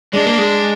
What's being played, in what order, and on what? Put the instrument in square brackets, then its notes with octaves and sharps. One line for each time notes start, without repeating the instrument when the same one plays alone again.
[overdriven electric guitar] G#3 [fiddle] D4
[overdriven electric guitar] A#3
G#3